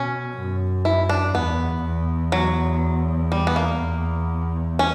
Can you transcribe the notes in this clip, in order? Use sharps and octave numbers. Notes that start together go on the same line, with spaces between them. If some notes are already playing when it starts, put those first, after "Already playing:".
Already playing: B2 C#4
F#2
E4
D4
E2 B3
E2
F#3
G3
B3
A#3
E2
C#4